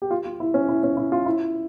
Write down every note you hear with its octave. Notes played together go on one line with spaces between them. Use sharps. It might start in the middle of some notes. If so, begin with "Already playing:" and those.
G4
F4
F4
E4
C#4
E4
C#4
E4
F4
E4